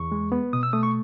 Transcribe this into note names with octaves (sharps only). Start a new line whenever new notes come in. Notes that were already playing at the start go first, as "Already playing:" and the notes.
Already playing: E2 C#6
G#3
B3
B2 D#6
E6
A3 D#6
C#6